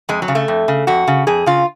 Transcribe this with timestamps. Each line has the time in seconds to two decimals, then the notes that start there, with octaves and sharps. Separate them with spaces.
0.09 F2 G#3
0.22 F#3
0.28 C#3
0.35 A3
0.48 F2
0.68 C#3
0.87 F2 F#4
1.07 C#3
1.27 F2 G#4
1.46 C#3 F4